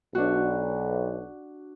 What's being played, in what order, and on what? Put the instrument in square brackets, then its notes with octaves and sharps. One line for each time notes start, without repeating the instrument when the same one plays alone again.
[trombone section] B1 [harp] D4 F#4